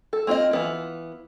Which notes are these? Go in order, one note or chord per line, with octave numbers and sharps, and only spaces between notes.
A4
A#3 C4 F4 G#4 D#5
E3 B3 F4